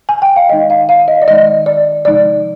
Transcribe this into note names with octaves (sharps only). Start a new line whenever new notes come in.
G#5
G5
F5
D#3 G#3 D#4 D#5
F5
F5
D#5
D5
D#3 G#3 D#4 D#5
D5
C3 F3 G#3 D#4 D5